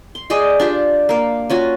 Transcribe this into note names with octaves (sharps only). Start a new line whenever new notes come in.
C6
G#4 D5 D#5 G5
D4 F4 G4
A#3 F5
C#4 F4 F#4